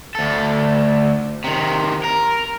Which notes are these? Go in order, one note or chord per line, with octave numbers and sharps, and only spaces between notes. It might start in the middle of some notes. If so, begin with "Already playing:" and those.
D2 A4
C3 D#3
A#4